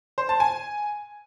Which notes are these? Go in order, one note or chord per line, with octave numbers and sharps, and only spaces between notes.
C5
A5
G#5